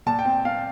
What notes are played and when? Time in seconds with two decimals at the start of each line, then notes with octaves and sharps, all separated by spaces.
0.06 A#2 A5
0.19 G5
0.25 C4
0.45 C4 F5